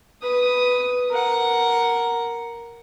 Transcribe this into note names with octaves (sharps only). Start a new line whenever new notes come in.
B4 D#6
A#4 F#5